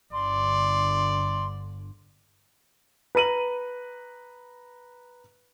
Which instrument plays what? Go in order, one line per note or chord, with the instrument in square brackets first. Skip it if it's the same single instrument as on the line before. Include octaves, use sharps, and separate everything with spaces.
[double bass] G1 D3 [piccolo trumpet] D5 [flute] C6
[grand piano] B4 A#5 D#7 F#7